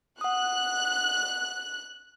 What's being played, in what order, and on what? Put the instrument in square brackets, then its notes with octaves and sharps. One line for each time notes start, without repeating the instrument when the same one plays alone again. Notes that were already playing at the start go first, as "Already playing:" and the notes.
[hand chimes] F#5 D#6 [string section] F#6